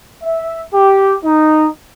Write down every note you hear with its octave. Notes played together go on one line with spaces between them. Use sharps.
E5
G4
D#4